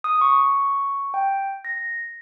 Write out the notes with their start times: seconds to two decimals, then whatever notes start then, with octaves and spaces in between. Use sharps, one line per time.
0.04 D#6
0.21 C#6
1.14 G5
1.65 A#6